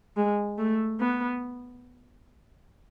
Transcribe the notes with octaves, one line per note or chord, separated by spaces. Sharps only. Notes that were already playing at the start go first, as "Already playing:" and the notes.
G#3
A3
B3